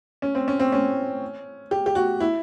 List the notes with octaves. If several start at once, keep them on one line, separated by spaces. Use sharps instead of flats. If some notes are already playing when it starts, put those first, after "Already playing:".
C#4
C4
C#4
C4
C#4
G4
G4
F#4
E4